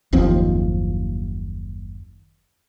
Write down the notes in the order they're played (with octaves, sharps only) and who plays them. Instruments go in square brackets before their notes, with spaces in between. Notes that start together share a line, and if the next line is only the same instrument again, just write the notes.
[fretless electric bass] F#1 D#2 F3 C4